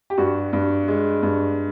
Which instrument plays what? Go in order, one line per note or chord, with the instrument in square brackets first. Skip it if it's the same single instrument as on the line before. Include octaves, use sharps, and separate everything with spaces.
[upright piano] G4
G2 F#4
G2
G#3
G2